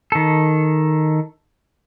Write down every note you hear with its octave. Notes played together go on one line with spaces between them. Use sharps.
D#3 A4